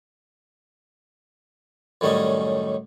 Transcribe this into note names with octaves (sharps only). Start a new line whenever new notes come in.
F#2 A2 D#3 G3 C#4 D#5